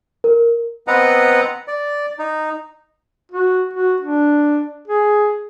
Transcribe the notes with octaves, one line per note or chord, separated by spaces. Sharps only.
A#4
B3 C4 B4 D#5 F#5 A#5
D5
D#4
F#4
F#4
D4
G#4